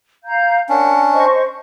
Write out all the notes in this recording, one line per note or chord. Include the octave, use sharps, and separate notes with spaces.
F5 A#5 G6
C#4 D4 A#4 F#5
C5 D#5 C#6